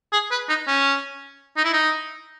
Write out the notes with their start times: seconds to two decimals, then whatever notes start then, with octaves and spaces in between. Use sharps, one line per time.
0.12 G#4
0.31 B4
0.49 D#4
0.67 C#4
1.57 D#4
1.65 E4
1.73 D#4